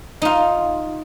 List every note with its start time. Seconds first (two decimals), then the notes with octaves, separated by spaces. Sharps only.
0.22 D#4 F4